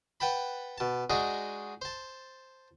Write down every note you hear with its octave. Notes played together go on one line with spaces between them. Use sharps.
B4 F#5 G5 A5 B5
B2 A5
G#3 D4 D#4 F#4 G#4
C5 A5